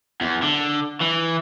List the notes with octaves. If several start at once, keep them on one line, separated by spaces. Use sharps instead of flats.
E2
D3
E3